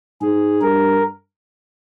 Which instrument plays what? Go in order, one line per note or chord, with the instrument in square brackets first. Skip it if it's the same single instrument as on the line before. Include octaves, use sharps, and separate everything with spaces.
[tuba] G#2 [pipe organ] G#4
[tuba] G2 [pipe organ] A#4